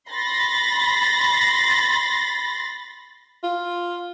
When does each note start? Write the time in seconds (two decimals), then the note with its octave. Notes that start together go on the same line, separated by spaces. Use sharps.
0.11 B5 C6 A6 A#6
3.43 F4